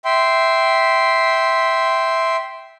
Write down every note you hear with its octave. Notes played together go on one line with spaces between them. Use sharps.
E5 G5 C6